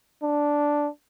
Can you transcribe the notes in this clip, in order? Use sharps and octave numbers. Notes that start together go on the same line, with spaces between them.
D4